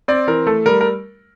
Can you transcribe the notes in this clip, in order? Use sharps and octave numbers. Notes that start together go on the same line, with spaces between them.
C4 D5
E3 A#4
A3 A4
G3 A#4
A#4